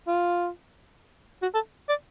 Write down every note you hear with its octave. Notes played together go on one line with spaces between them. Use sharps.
F4
F#4
A4
D5